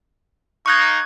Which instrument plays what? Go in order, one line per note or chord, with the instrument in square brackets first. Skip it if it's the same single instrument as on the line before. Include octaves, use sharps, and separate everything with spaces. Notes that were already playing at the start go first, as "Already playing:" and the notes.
[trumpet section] A#3 D#4 [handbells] C#6 F#6 G#6